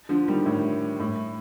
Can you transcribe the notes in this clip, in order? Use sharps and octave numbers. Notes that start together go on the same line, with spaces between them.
D3 F3
D#3 G3
A2
A2